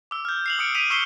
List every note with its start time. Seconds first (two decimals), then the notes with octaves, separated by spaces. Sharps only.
0.11 D6 E6
0.25 F6 G6
0.46 C7 F7 F#7
0.59 D#6 F6 C#7 D7
0.75 E6 B6 D7 D#7 F7
0.90 C#6 E6 B6 C7 E7 G7